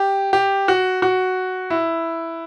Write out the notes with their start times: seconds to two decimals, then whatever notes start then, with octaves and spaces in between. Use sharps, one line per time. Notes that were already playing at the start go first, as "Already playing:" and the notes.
Already playing: G4
0.33 G4
0.68 F#4
1.02 F#4
1.70 E4